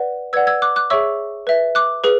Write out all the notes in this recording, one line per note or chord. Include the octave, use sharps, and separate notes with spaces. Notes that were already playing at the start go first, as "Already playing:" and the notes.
Already playing: B4 D5 F#5
B4 D5 F#5 E6 G#6
E6 G#6
D6 F#6
D6 F#6
G#4 C#5 E5 C#6 E6
B4 E5
D6 F#6
G#4 B4